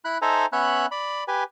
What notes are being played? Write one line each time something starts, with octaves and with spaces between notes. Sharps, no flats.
E4 B5 F#6
D#4 A4 C5 E5 G#5 A#5
B3 C#4 C#5 E5 B5 F#6
D5 B5
G4 B4 G#5